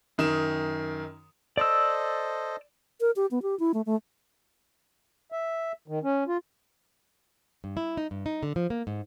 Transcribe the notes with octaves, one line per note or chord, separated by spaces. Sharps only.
F#2 D#3 D#6 E7
A4 C5 D5 D#5 E6
A#4
G4
B3
G4
E4
A3
A3
E5
D#3
C#4
F4
G2
E4
D#4
G2
D#4
D3
F3
A#3
G#2